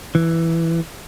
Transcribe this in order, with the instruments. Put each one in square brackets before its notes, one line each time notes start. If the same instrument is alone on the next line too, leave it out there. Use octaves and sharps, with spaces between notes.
[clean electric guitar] E3